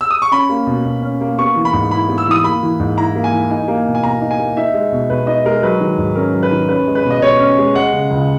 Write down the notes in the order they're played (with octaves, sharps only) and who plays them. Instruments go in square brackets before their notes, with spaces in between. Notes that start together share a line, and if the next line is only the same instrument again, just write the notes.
[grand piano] E6
D#6
C#6
C#4 B5
A#3
B2
B2
C#4
A#3
B3 C#6
E3
B5
G#2
E4 B5
B3
E6
E3 D#6
A#3 B5
E3
G#2
E4 A#5
A#3
G#5
E3
D#4 G#5
A#3
G#5
B2
G#5
B2 A#5
D#4
G#5
A#3
D#4 E5
G#3
B2
B2 B4
D#4 D#5
G#3 A#4
F#3 B4
D#3
G#2
C#4 A#4
F#3
B4
D#3
C#4 B4
G#3
B4
B2
D#5
B2 C#5
C#4
G#3
G#3 F#5
C#3
C#2